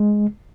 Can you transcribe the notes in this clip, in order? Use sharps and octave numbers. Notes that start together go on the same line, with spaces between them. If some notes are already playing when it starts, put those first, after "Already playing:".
Already playing: G#3